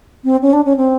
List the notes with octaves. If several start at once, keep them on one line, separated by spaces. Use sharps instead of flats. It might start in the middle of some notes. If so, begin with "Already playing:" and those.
C4
C#4
D4
C#4
C4